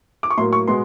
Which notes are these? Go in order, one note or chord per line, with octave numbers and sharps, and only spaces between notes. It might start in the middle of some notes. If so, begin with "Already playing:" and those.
D6
C#6
A2 F#3 A#3 C6
C#6
B2 G#3 B3 C6